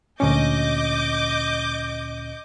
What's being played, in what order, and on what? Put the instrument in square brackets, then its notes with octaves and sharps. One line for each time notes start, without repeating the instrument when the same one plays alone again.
[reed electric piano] D2 A#2 C#4 [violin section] D#5 D6 G6